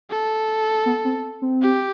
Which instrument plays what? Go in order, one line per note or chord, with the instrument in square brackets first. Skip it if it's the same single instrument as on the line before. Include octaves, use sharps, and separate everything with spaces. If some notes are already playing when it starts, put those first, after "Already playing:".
[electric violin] A4
[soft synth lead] B3
C4
C4
[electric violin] G4